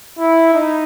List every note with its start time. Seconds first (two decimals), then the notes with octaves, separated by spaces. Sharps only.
0.19 E4
0.54 D#4